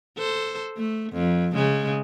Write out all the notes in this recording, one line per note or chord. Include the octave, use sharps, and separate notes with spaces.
A4 C5
A3
F2
C#3 G#3